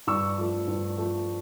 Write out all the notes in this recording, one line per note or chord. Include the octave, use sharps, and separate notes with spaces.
G2 C#6 E6
F3 A3
G2
F3 A3